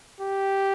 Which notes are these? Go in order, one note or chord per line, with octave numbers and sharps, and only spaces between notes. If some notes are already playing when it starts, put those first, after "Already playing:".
G4